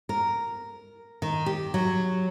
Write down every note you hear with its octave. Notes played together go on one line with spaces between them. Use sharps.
A#4
D#3
G4
F#3